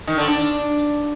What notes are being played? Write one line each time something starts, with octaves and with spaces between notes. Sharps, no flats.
D#3
D3
D4